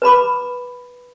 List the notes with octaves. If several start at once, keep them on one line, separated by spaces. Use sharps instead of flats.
B4 A#5 B5 D6